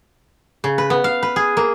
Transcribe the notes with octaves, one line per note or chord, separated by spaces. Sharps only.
C#3
B4
B3
F5
B4
G#4
A#3